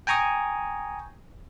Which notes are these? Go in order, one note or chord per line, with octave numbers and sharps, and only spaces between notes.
G5 G#5 A#5 C#6 D#6